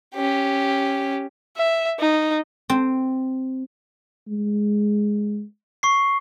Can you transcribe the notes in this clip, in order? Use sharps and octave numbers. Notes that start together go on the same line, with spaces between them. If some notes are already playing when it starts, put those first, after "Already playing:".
C#4 G4
E5
D#4
C4
G#3
C#6 C7